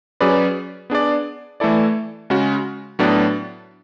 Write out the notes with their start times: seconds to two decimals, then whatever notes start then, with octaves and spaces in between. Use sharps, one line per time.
0.20 F#3 C#4 G#4 B4 D5
0.90 B3 D4 G#4 D5
1.60 E3 A3 E4 A4 D5
2.30 C#3 G#3 C#4 F#4
2.99 A2 F#3 B3 D4